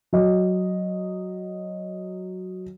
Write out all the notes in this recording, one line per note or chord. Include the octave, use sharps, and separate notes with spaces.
F#3 D#5